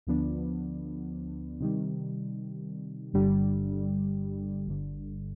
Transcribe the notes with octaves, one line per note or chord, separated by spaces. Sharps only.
D2 D3 F3 B3 D4
C3 D#3 G3
G1 G2 D3 G3
G1 G2 D3